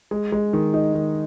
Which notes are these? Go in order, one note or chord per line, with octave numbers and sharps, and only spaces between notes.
G#3
G#3
D#3
D#4
D#3